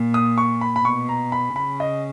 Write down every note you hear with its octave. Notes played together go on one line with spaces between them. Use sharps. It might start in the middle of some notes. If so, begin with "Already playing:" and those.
Already playing: A#2
D#6
C#6
B5
B5
B2 C#6
A#5
B5
C#3 B5
D#5